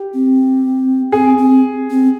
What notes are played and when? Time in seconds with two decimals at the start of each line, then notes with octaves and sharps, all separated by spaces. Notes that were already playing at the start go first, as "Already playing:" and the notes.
Already playing: G4
0.14 C4
1.12 C4 G#4
1.38 C4
1.90 C4